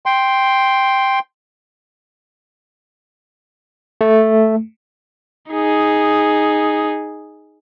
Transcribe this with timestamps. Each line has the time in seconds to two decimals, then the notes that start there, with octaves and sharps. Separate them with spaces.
0.06 G5 C6
4.01 A3
5.50 D#4 G#4